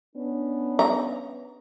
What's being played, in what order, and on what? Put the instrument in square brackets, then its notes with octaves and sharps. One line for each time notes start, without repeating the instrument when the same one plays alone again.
[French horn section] B3 C#4 D4
[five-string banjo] A#5